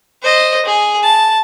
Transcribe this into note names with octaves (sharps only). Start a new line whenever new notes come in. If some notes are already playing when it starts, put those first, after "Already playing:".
C5 D#5
G#4
A5